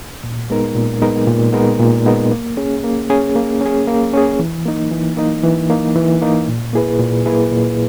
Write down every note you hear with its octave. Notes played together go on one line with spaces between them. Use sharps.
A#2
G#3 B3 D#4 A#4
A#2
G#3 B3 D#4 A#4
A#2
G#3 B3 D#4 A#4
A#2
G#3 B3 D#4 A#4
A#3
C#4 G#4
A#3
C#4 G#4
A#3
C#4 G#4
A#3
C#4 G#4
E3
A#3 D#4
E3
A#3 D#4
E3
A#3 D#4
E3
A#3 D#4
A#2
A#3 E4 G#4 B4
A#2
A#3 E4 G#4 B4
A#2